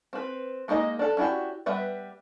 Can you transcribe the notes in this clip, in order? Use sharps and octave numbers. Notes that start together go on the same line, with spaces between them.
C4 B4
G#3 A#3 D#4 C5 D#5
D4 A4
C#4 D4 E4 F#4 G4
G3 B3 B4 E5